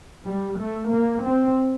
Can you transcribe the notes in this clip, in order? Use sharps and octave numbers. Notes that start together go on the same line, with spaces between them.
G3
A3
A#3
C4